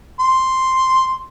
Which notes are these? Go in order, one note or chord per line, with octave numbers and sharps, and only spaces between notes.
C6